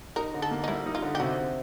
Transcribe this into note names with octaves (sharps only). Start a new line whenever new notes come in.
D#4 A#4
D3
A4
A#3
D#4
G3 E4
D#4
F4
D3
G4
C3 F#4
C3